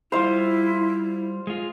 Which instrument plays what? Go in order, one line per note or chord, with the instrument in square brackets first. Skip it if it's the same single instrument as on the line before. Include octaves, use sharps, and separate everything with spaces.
[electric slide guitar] G3 F4 [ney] E4 [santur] C5 F5
[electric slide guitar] G#3 F4